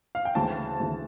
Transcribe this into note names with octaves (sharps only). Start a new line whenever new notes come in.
F5
G5
D2 C#3 E3 A5
D2 C#3 E3